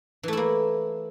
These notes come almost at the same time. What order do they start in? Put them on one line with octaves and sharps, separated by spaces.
E3 A3 E4 A#3